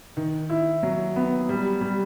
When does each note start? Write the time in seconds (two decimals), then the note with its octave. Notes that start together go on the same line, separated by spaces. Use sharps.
0.17 D#3
0.50 E4
0.83 F#3
1.16 B3
1.49 G3
1.81 G3